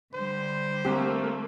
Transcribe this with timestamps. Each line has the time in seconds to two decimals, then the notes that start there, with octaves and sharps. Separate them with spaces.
0.14 D3 G3 C5
0.85 A3 A#3 C4 G4